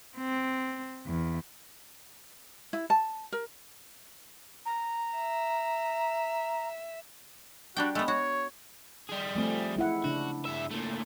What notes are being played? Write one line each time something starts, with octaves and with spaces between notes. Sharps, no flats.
C4
E2
E4
A5
A#4
A#5
E5
G3 D4 F#4 G5
G#3 A3 B3
F#4 C#5
G3 G#4
F3 A3 C4
G#3 E4 F#5
C#3 D4 F#4
G2 E5
A#2 A3